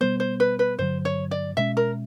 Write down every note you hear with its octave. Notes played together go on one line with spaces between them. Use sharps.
B2 G3 B3 C5
C5
B4
B4
G2 D3 F#3 C5
C#5
D5
B2 G#3 C#4 E5
A#4